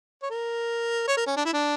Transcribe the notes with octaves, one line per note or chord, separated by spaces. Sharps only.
C#5
A#4
C#5
A#4
C#4
D4
E4
D4